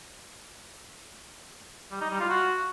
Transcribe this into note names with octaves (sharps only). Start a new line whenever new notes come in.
G3
D#4
G3
F4
F#4